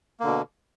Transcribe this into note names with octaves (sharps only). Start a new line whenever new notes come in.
B2 D3 A#3